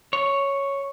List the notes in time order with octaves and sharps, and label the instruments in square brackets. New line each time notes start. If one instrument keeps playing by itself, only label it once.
[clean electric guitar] C#5